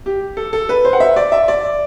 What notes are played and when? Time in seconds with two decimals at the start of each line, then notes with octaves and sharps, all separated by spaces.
0.06 G4
0.37 A4
0.53 A4
0.69 B4
0.85 C5
0.93 F#5
1.00 E5
1.16 D5
1.32 E5
1.48 D5